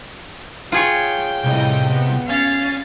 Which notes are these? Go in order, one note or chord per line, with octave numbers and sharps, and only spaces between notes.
F4 G#4 C#5 G5
C2 A2 C3 D#5
B3
C#4 F5 A6